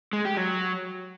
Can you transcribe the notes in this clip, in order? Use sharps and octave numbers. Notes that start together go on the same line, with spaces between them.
G#3
G4
F#3